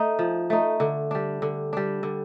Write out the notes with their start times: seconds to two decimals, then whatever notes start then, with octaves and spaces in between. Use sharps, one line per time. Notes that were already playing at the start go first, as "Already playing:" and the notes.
Already playing: A3 D#4
0.19 F3
0.50 A3 D#4
0.80 D3
1.11 G3 D4
1.42 D3
1.73 G3 D4
2.03 D3